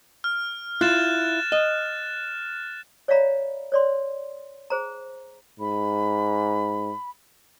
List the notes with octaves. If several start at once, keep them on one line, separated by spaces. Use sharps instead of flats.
F6
E4 F4 F#6 A6 E7
D#5
C#5 D5 E5 F5 A#5 B5
C#5 D5 C6
G#4 C5 A#5
G#2 B5